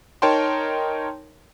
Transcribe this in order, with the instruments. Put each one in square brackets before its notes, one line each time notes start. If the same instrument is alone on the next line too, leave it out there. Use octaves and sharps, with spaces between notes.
[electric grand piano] D#4 A#4 C#5 G5 A5 C6